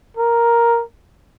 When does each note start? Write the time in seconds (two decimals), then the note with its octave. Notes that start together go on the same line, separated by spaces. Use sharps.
0.17 A#4